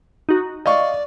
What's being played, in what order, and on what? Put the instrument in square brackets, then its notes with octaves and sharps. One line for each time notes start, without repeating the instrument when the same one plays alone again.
[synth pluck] D#4 F#4
[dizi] D5 [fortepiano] D#5 F5 C#6